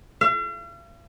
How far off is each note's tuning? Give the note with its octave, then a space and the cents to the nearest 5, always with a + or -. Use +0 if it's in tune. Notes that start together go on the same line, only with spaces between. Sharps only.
F5 -45